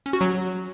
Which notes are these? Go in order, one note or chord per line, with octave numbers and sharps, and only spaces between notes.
C#4
F#4
F#3